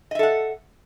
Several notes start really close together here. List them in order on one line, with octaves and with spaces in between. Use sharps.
D#5 E5 A4 F#5